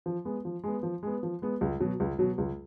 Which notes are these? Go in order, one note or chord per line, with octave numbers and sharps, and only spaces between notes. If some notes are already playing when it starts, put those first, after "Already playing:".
F3
G#3 B3
F3
G#3 B3
F3
G#3 B3
F3
G#3 B3
C#2
B2 F#3
C#2
B2 F#3
C#2